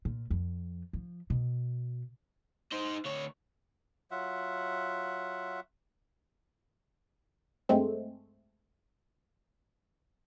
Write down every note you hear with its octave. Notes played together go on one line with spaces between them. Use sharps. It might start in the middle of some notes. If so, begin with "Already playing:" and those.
A#2
F2
F3
B2
D#4 C5
D2 C#5
F#3 F4 E5 F#5
G2 G#3 A3 C4